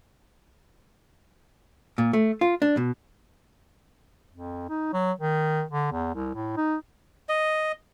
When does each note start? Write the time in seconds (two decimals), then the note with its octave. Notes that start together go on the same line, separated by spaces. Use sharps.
1.98 A#2
2.13 A3
2.41 F4
2.62 D4
2.77 B2
4.32 F2
4.70 D#4
4.93 F#3
5.20 D#3
5.71 D3
5.92 E2
6.15 C2
6.35 A2
6.57 D#4
7.29 D#5